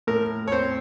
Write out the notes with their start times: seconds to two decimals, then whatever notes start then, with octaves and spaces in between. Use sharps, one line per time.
0.07 A2 A#4
0.48 C#5
0.52 C4 C5